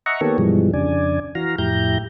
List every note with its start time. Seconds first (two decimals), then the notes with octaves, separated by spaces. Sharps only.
0.06 D#5 E5 F#5 A#5 C#6
0.21 D#3 A#3 B3 G4 A4 C#5
0.38 G2 B2 E3 F3 G3 G#3
0.74 F2 C#3 D4 D5 G#5
1.35 E3 F#4 F5 A#5
1.58 F2 A2 E4 G4 A#5 G6